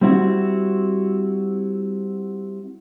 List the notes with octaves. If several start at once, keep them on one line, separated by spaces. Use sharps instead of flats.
G3 C4 E4 F#4